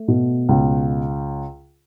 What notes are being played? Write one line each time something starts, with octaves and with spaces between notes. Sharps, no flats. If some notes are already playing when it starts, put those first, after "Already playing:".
Already playing: A3
B2
C#2